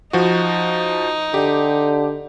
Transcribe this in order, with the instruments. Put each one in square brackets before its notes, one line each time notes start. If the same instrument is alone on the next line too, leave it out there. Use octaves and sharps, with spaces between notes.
[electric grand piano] F3 F#4 [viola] D#4
[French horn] D3 [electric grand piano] G4